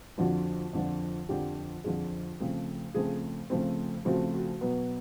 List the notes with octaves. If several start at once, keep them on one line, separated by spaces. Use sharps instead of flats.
F2 D3 F3 F#4
F2 D3 F3
F2 D3 F3 G4
F2 D3 F3 G#4
C#3 F3 A3 C4
C#3 F3 A3 C4 G#4
C#3 F3 A3 C4
C#3 F3 A3 C4 F#4
F#4
B2 F#3 B3